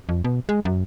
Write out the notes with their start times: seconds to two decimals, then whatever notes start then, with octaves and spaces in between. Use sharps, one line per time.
0.09 F2
0.24 B2
0.49 G#3
0.65 F#2